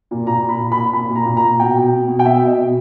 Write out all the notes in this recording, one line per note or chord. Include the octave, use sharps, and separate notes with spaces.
A#2
A#2 A#5
A#2
B5
A#2
A#2 B5
A#2 B5
A#2
A#5
A#2
A#5
A#2
B2 G5
B2
B2
B2
G5
B2 E5
B2
D#5
B2